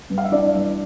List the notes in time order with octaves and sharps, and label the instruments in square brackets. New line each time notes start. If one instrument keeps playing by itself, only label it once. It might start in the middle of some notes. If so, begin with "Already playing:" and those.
[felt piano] G2
F5
E5
E3 D4 D5
G2